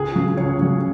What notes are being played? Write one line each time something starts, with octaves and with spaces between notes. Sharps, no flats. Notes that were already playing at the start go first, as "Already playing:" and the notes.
Already playing: C#2 G#4
C#3 F#3
C#2 C#5
C#3 F#3